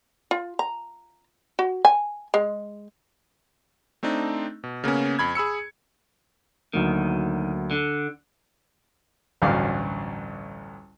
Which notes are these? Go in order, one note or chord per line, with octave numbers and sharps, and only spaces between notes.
F4
A#5
F#4
G#5
G#3
A3 C4 D4 D#4
B2
C#3 A#3 B3 C#4
F2 B5 G#6
G#4 B5 E6 C#7
D2 D#3 F#3 A#3
D3
A1 D2 G2 F#3 F5 D6